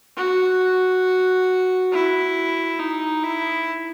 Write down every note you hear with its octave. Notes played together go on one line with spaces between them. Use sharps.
F#4
E4
D#4
E4